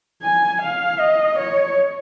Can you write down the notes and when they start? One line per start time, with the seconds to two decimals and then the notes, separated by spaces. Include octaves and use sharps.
0.23 G#5
0.62 F5
1.00 D#5
1.39 C#5